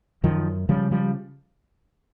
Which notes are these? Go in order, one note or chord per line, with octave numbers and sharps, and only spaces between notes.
F#2 D#3 F3
C#3 F3 G3
F3 G3